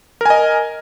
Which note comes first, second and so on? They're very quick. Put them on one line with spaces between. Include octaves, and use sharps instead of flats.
A#4 G#5 D#5